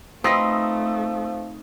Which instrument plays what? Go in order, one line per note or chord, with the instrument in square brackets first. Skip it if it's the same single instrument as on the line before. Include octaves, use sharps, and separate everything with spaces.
[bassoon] F3 [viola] A3 [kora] C4 D#4 B4 [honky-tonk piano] D#6 E6 A#6